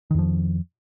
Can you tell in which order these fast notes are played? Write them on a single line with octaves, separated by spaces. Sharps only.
D#3 F2 F3